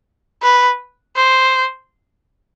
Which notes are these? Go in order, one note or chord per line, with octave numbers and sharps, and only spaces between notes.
B4
C5